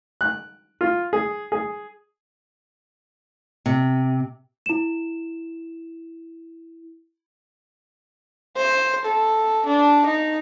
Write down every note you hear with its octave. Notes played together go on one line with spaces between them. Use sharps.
F#6
F4
G#4
G#4
C3
E4 E7
C5
A4
D4
D#4